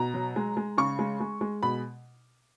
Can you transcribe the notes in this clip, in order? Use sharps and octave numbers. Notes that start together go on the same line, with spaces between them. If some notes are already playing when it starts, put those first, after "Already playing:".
Already playing: B2 A#5
F#3
G#3
G#3
C#3 C#6
G#3
G#3
G#3
B2 B5